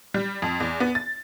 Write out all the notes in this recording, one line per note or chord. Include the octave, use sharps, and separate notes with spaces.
G3
F2
E2
B3
A6